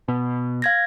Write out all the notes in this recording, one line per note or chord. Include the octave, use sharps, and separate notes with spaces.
B2
F5 G#6 A#6